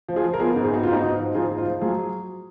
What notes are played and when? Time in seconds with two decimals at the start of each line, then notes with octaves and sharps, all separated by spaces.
0.09 F3
0.16 F4 G#4
0.24 F3
0.34 A#4
0.40 B3 F4 G#4
0.56 G#2
0.64 G#4
0.71 B3 F#4
0.83 G#2 F4
0.93 D#4 F#4
1.03 G#2
1.19 F3
1.34 G#2 F4 G#4
1.50 F3
1.58 F4
1.66 F3
1.81 F#3 F4 G#4